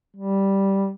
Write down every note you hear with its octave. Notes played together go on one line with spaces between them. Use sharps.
G3